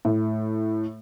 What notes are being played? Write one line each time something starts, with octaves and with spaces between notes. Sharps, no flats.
A2